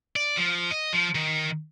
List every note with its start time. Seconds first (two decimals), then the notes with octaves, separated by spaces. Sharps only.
0.16 D5
0.37 F3
0.71 D#5
0.93 F3
1.15 D#3